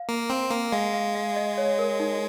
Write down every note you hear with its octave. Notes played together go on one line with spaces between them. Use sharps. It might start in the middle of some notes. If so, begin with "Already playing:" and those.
Already playing: F5
A#3
C4
A#3
G#3 F5
F5
F5
D#5
C#5
A#4
D#4